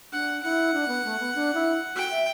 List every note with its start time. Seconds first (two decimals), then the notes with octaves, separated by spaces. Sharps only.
0.12 D4 F#5
0.43 E4 F#5
0.74 D4
0.88 B3
1.05 A3
1.20 B3
1.35 D4
1.55 E4
1.95 F#4 G5
2.11 E5